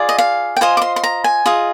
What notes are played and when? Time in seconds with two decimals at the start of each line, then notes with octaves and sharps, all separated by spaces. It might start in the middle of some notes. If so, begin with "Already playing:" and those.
Already playing: F4 G#4 D5
0.09 D#5
0.18 F5
0.57 G5
0.61 F4 C5 D#5 G#5
0.77 D6
0.82 C6
0.96 C6
1.04 A#5
1.24 G#5
1.46 F4 G#4 D#5